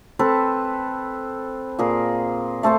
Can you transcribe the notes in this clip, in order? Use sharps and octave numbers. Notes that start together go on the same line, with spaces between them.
C4 A4 B4 B5
A#2 G#4 A#4
A3 A4 C5 A5